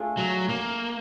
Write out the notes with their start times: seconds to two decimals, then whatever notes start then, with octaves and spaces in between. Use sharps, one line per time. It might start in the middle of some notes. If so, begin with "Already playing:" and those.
Already playing: A3 D4 F4 G#4
0.17 F#3
0.49 A#3